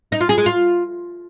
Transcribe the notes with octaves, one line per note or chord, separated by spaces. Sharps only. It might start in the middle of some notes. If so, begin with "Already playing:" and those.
D#4
F4
G#4
G#3
F4